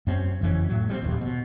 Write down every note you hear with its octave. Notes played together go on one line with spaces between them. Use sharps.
F#2 C4 C#4
F#1 F2 E3 C#4
A2 F#3
G3 B3 C4
D#1 A#1 D#2
B2